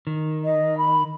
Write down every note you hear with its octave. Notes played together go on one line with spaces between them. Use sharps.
D#3
D#5
B5